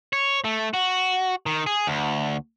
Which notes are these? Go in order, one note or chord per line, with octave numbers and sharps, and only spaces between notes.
C#5
A3
F#4
D#3
G#4
D2